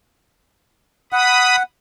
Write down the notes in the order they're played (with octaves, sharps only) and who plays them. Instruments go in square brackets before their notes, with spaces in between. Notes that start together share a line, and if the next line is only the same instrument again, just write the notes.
[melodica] F#5 [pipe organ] B5 D#6